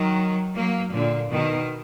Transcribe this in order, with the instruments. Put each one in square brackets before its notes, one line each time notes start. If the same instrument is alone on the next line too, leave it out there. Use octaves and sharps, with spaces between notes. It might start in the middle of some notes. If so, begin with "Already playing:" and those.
Already playing: [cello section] D#3 F#3
F#3 A#3
A#2 D3
B2 D#3